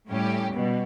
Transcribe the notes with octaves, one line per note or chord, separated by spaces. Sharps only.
A2 G3 C#4 G4
B2 G3